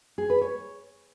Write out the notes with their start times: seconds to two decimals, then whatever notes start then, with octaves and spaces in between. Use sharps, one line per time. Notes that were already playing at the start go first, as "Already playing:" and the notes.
0.18 G#4
0.30 B4
0.41 C#5